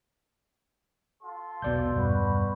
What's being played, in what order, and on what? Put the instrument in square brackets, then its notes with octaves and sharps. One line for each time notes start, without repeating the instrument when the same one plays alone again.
[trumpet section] F4 A4 C6
[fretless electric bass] E1 B1 [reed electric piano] B2 D5 G6
[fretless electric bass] E2 G2 G3 [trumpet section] F#4 B4